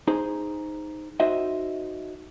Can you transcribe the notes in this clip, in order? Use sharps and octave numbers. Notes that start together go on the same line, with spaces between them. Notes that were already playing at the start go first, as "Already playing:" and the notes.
D#4 G#4 C5
D#4 F#4 C5 D#5 E5